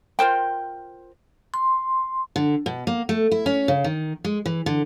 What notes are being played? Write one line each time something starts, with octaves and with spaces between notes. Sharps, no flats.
F4 A#4 C5 G5
C6
D3
B2
A#3
A3
E4
C#4
C#3
D#3
G#3
E3
D3